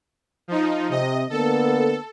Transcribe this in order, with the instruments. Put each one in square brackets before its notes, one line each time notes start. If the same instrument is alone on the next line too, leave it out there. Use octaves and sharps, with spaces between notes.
[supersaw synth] F3 D#4
[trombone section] C3 [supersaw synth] D#5
[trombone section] D3 A#3 B3 [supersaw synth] A4